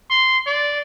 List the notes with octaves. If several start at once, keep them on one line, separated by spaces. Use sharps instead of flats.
C6
D5